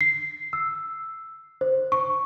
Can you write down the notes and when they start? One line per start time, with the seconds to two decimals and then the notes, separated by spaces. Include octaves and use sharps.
0.01 C7
0.53 E6
1.61 C5
1.92 C#6